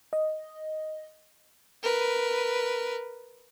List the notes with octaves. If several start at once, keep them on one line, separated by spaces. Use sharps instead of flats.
D#5
A#4 B4